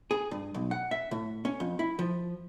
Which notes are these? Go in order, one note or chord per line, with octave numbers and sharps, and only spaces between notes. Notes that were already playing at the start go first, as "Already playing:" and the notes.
G#4
G2
B1
F#5
E5
A2
C#4
F2
E4
F3